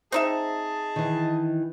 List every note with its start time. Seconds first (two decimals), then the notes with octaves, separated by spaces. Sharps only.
0.12 C4 D#4 G#4 D#5 E5 A5
0.96 D#3 E3